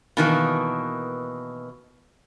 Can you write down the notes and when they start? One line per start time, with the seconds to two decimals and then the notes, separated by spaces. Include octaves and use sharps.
0.17 B2 D#3 E3 A#3